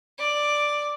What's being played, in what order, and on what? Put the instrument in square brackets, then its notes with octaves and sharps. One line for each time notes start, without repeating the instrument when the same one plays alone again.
[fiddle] D5